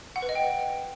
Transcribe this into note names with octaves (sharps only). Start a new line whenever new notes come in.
F#5
B4
D#5
G5